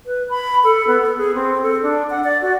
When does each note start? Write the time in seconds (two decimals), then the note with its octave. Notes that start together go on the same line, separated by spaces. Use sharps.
0.06 B4
0.29 B5
0.64 A4
0.87 B3
1.02 A4
1.17 G#4
1.35 C4
1.62 A4
1.82 D4
2.10 F#5
2.24 D5
2.42 F#4